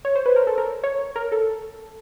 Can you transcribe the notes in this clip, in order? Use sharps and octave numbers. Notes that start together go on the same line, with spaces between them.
C#5
C5
B4
A#4
A4
A#4
C#5
A#4
A4